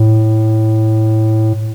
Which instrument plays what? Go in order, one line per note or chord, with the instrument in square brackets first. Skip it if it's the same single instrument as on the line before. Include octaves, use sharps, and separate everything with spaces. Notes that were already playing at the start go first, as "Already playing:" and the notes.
Already playing: [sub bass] A2